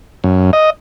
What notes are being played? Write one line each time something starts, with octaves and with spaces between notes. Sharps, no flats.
F#2
D#5